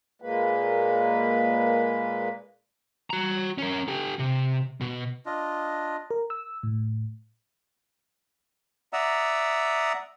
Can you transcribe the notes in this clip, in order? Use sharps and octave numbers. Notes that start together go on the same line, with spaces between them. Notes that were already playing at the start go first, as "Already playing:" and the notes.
A#2 G#3 A#3 B4
F#4 A#5
C#4 A#4
G4 A4
C3
B2
D4 F4 D#5
A#4
E6
A2
D5 E5 F#5 A#5 D#6 E6